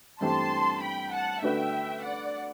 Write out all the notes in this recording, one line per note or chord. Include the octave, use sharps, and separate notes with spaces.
G2 E3 A3 C4 G4 A5 C6
G5 B5
F#5 A5
D3 A3 D4 F#4 B4 E5 G5
D5 F#5